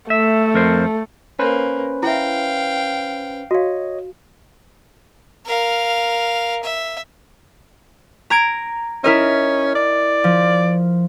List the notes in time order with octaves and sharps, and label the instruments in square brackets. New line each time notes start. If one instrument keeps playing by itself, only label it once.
[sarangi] A3 [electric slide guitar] E5
[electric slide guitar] F2 A#4 C5
[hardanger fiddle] A#3 [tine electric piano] C#4 B4 C5
[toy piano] E4 E5 [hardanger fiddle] F5 G5
[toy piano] F#4 F5 [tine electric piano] C#5 D#5
[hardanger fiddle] A#4 F5
E5
[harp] A#5 G#6 D7
[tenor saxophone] C#4 [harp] E4 A#4 D#5
[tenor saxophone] D5
[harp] F3